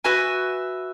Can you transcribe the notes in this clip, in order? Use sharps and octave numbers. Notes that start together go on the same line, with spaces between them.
F#4 B4 E5 G#5